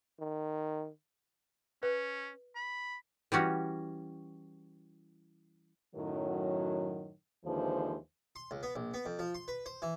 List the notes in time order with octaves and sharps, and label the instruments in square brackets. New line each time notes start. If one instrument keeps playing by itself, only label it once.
[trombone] D#3
[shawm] C#4 [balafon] B4
[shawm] B5
[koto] E3 G3 C#4 F#4
[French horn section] F#2 A2 D#3 F#3
D#2 D3 E3 F3 G#3 C5
[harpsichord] C6
C#2
B3
A#1
B3
F2
F3
C6
B4
C5
E3